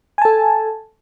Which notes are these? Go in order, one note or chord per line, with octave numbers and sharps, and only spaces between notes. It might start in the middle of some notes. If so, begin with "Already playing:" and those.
A4 G#5 A5